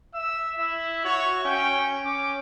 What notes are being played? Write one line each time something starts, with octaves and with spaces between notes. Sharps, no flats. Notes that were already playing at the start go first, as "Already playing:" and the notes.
E5 E6
E4
F#4 C#5
C#4 G5
C#4 D6